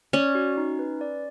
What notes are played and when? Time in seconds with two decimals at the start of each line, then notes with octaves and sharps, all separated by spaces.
0.13 C#4 D5
0.35 F#4
0.58 D#4
0.79 B4
1.01 D5